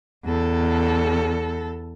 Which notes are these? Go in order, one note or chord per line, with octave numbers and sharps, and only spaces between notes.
E2 A4